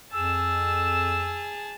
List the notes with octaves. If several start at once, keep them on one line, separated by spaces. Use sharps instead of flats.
F2 G#4 A5 E6